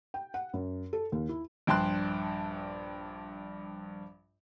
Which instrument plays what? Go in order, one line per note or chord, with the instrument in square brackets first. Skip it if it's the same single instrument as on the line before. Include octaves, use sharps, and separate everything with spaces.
[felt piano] G5
F#5
F#2
A4
D#2
E4
[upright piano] A#1 G2 G5 A5 C6 F#6